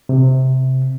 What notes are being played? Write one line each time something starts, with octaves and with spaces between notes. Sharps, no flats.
C3